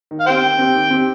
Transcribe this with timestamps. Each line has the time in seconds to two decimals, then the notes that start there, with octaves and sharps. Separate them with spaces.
0.11 D#3
0.20 F5
0.27 C4 G4 C5 G5
0.42 D#3
0.59 C4 G4
0.75 D#3
0.91 C4 G4